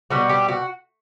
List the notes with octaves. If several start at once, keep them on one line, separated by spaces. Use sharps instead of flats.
B2 G3 F#4
G4
F#4